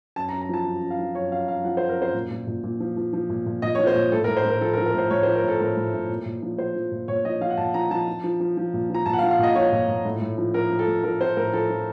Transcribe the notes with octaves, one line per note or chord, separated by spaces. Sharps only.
F#2 A5
A#5
F#2
A#5
F3 A5
F#2
F#2
F5
F3
F#2 C#5
F#2 F5
F#2 F5
F3 F#5
C5
F#2
A#4
F#2 C5
A#2
A#2
A#2
A#2
F3
F3
F3
A#2
A#2
A#2 D#5
C#5
F3
C5
A#2
A2 A4
A#4
A2
C5
A2 A#4
F3 A4
A#4
F3
A#4
A2 C5
A2 C#5
C5
F3
A#4
A2 A4
A2 A#4
A2
A2
A#2
A#2
F3
F3 C5
F3
A#2
A#2 C#5
F3 D#5
F3 F5
F#5
A#2 A5
F3 A#5
F3 A5
F3
F3
F3
F3
A#2
F3 A#5
A#2 A5
F#5
F5
F3
F5
A#2 D#5
F3 C#5
A#2
A#2
A2
A2
F3
F3 A#4
F3
A4
A2
F3 A#4
F3 C5
A2 A#4
F3 A4
F3